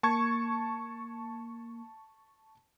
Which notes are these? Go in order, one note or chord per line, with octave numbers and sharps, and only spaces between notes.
A#3 A5 C#6 G#6